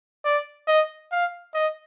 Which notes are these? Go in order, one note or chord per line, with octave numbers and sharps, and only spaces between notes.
D5
D#5
F5
D#5